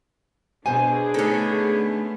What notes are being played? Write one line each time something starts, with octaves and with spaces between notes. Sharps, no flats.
B2 D4 G#4 C5 G#5
D3 A3 B3 C#4 D#4 A4